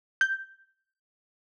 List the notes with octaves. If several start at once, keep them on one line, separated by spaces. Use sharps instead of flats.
G6